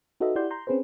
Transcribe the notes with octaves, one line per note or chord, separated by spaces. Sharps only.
D#4 F#4 A4 B4 D#5 E5
E4 G4 D5 F#5 C6 G6
A#5 C6 G6
C4 C#4 G#4 B4 C5